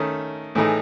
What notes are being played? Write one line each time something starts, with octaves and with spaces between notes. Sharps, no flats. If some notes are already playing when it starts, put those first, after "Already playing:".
Already playing: D#3 A3 C#4
A2 E3 A3 D#4 G#4